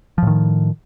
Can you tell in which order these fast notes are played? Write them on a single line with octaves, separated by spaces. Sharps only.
F3 A2 D#3